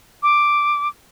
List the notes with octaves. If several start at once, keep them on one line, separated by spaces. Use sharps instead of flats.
D6